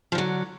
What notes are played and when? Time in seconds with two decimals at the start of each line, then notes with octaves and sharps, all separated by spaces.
0.12 F3
0.15 D3
0.18 F#3